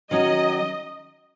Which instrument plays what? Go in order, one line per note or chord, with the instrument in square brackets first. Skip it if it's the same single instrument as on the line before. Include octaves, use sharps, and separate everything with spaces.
[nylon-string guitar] D#3 F#3 C#4 F#4 [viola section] D#5